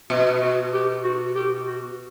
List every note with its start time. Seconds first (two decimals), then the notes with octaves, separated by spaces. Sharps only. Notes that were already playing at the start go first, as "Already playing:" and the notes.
0.10 B2 F#4
0.41 F#4
0.73 G4
1.04 F#4
1.35 G4
1.67 F#4